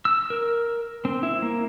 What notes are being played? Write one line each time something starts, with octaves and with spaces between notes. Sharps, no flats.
E6
A#4
C4
E4
A#3